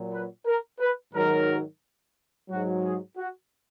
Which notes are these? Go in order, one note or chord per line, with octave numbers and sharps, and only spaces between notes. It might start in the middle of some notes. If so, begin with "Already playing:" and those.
Already playing: A#2 F#3
B4
A#4
B4
G#2 D#3 F#3 A#4
G#2 F#3 F#4
G#4
F#4